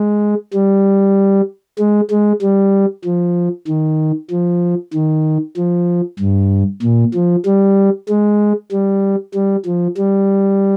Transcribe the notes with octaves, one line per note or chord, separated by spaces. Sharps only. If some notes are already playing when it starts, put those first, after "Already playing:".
Already playing: G#3
G3
G#3
G#3
G3
F3
D#3
F3
D#3
F3
G2
A#2
F3
G3
G#3
G3
G3
F3
G3